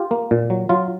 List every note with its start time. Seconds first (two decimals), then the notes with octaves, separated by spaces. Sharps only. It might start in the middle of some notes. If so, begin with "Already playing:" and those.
Already playing: F4 G4
0.11 A#3
0.31 A#2
0.50 F#3
0.69 F#3 F4